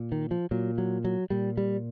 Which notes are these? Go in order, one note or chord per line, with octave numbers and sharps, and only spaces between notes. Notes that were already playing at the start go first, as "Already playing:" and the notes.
Already playing: A#2
D#3
F3
A#2 F#3
F#3
F#3
A#2 G3
G3